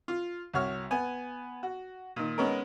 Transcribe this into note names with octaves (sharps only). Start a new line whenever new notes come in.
F4
C2 F#4 C#5 F6
B3 G#5
F#4
A#2 D#3
G#3 B3 C#4 D#4 A#4